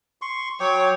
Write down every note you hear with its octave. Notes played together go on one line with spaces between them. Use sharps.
C6 C#6
F#3 C#5 G5 D6